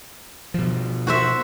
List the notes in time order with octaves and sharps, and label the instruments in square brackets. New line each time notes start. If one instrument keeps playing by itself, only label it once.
[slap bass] B2 F3
[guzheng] F#4 C5 E5